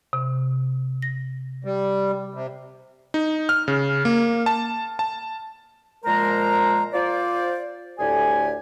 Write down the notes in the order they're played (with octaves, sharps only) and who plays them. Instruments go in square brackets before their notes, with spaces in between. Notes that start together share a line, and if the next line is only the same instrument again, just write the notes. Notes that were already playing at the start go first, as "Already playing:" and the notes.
[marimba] C3
A#6
[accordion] G3
C3
[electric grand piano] D#4
F6
C#3
A#3
A5
A5
[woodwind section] A#2 F3 G#3 A#4 C5 A#5
F4 C5 D5
D2 A2 G4 D5 G#5